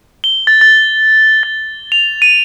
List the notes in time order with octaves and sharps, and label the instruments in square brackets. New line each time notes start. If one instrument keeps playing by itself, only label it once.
[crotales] G7
A6
A6
A6
F7
D#7